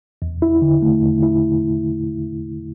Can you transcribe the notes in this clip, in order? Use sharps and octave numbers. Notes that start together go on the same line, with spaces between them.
E2
E4
D3
A3
E2
E4